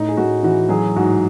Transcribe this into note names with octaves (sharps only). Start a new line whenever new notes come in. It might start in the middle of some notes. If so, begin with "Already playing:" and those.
Already playing: A2 D#4
G#4
A2 F#4
E3 F#4
F#3 G#4
G#2 F#4